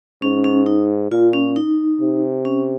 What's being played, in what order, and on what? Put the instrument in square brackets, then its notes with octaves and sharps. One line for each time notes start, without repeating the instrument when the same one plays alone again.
[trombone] G#2 [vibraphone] C#4
[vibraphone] C#4
D#4
[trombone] A#2 [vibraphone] F4
[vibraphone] C#4
D#4
[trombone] C3
[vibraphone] C#4